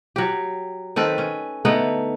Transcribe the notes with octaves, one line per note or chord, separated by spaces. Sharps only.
F#3 G4
D#3 C4 A4 B4
C#4
D3 A3 B3 D#4